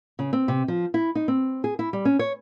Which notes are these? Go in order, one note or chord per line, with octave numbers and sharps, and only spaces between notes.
C#3
C4
C3
F3
E4
D#4
C4
G#4
E4
G3
C#4
C#5